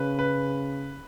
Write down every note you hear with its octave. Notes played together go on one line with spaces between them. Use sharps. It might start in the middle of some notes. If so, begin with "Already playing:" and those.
Already playing: C#3 B4
B4